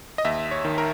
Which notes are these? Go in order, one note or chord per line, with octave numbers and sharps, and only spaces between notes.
D#5
D#2 E5
C#5
D#3
A#4